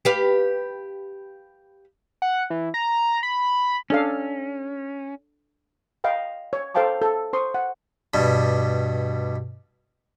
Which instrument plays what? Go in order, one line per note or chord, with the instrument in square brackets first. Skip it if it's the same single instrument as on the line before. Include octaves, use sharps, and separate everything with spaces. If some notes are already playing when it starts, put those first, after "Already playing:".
[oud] G4 B4 F5
[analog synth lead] F#5
E3
A#5
B5
[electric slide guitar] C#4 [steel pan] D4 A4 F5
[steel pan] D#5 F5 G5 B5
C#5
A4 C5 F5 G5 A5 D6
A4
C5 C6 C#6 D#6
F#5
[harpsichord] G2 B2 G3